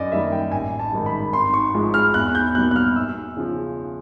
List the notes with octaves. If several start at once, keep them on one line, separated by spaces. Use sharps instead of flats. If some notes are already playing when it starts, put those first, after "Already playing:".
Already playing: F#2 D5 D#5
D#3 G3 A#3 E5
G5
A1 G#5
A5
G#2 D#3 G3
B5
G#1 C6
C#6
G#2 F3 G#3
F6
E2 F#6
G6
B2 G3 A#3 F#6
F#6
F6
E2 E6
C#3 F3